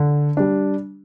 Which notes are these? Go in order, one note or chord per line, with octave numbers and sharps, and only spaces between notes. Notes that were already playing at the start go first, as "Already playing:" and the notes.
Already playing: D3
G3 D4